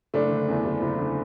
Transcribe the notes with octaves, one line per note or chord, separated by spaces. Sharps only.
F#1 A3 D4
D3
E2
F#1
F#1
D3